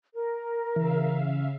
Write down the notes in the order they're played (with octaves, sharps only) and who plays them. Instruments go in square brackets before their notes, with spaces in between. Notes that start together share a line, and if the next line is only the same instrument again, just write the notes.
[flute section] A#4
[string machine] C#3 E5 F5 [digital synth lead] E3